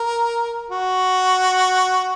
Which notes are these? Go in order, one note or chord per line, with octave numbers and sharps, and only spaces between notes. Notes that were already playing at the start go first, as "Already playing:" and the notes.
Already playing: A#4
F#4